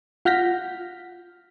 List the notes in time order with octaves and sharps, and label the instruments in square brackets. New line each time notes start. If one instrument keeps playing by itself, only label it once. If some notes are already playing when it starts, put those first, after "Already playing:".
[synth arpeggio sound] F4 F#5 F6 G6 A#6 B6